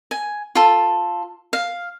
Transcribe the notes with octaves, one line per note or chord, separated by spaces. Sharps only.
G#5
F4 A4
F5